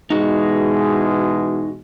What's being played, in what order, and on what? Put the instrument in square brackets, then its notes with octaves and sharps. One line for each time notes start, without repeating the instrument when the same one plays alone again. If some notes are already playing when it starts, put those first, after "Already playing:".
[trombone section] B2 E3 G#3 [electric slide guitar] D#4 F#4